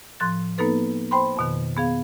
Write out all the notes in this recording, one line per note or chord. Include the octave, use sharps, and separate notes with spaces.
A2 F3 C6 F#6 A6
A#3 B3 D#4 A4 B4
C5 G5 B5 C6
F2 B2 D#3
B3 G#4 F5